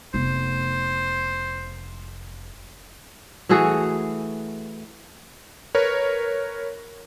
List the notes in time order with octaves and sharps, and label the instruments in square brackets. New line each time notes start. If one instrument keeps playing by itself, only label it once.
[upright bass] F1 B3 [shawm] C5
[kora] E3 A3 F#4 G#4
[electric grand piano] A#4 B4 C#5